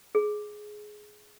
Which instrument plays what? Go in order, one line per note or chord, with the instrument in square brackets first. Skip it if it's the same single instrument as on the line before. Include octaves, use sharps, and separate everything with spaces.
[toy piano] G#4